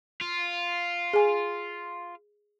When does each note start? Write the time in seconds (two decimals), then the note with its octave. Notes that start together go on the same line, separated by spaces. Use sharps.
0.21 F4
1.13 G#4 G#5